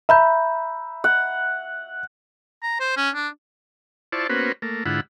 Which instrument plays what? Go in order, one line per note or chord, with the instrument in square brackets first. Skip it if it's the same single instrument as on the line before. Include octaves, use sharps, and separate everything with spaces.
[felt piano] E5 [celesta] A#5 B5 G6
[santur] F#5
[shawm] A#5
C5
C#4
D4
[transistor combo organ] E4 F4 C5 D5 A5 C#6
A#3 B3 C#4 F#4 B4 C5
A3 A#3
G#2 D3 E4 F4 F#5 B5